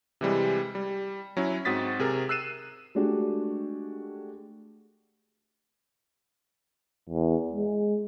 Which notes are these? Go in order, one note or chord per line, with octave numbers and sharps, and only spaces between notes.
C3 E3 G3 G#3
G3
F#3 C#4 E4
G#2 C4 F#4 D#6 A6 B6
C3 G#4 A#4
E6 F#6 C7 D#7 E7
G#3 A3 D4 F#4 G4
E2
G#3